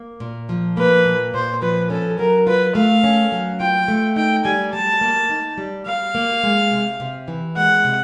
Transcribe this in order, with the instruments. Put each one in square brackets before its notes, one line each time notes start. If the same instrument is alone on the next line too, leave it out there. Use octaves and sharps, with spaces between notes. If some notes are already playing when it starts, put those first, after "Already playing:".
Already playing: [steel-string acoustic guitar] A#3
A#2
F3
[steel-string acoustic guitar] A#3 [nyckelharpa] B4
[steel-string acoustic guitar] A#2
[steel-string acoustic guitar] A#2 [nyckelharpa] C5
[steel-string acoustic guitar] F3 [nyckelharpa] B4
[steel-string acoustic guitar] C#4 [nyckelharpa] A4
[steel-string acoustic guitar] F#3 [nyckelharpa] A#4
[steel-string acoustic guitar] F4 [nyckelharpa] B4
[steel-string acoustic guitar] A3 [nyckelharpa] F5
[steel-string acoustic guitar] C#4
F#3
[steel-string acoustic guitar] F4 [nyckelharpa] G5
[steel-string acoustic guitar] A3
[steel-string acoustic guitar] D#4 [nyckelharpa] G5
[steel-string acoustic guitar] G3 [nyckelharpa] G#5
[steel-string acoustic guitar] G3 [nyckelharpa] A5
[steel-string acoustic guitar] A#3
D#4
G3
[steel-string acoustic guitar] G3 [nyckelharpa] F5
[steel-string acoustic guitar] A#3
G#3
C3
C3
E3
[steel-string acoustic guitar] G#3 [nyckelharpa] F#5
[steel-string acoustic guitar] C3